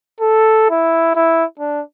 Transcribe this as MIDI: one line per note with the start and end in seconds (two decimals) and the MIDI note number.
0.20 0.66 69
0.71 1.15 64
1.15 1.44 64
1.59 1.81 62